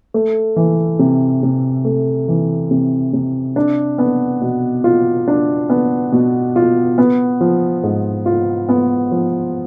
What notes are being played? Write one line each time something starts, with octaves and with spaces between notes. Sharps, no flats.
A3
E3
C3
C3
A3
E3
C3
C3
D4
B3
B2
F4
D4
B3
B2
F4
B3
F3
G#2
F4
B3
F3